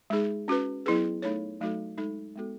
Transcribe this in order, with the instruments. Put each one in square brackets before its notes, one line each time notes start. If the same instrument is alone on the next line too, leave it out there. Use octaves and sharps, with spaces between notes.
[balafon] G#3 D#4 G#4
C#4 F#4 B4
F#3 B3 E4 G#4 B4
A3 D#4 A4 C#5
F#3 A3 D#4 F#4 A4
G#3 D#4 A4
G#3 B3 F#4 A4